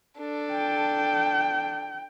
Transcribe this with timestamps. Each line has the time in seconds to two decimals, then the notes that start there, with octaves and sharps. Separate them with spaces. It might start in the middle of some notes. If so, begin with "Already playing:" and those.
0.19 D4 A4
0.52 G5